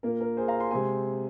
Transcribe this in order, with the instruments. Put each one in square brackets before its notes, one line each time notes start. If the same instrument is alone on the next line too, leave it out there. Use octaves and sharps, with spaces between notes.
[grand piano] A#2 A#3 A#4
A#4
G#4 C5
F5 A#5
G#5 C6
C3 G#3 C4 G#5 C6